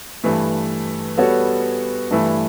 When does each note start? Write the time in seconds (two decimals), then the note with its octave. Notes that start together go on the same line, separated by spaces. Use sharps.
0.24 G2 E3 A3
1.18 G3 B3 F#4 A4 C#5
2.11 G2 E3 A3 E4